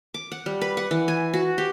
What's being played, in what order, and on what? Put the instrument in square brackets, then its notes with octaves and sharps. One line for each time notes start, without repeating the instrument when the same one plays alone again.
[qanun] D6
F#5
G3
B4
F#5
E3
G#5
F#4
G4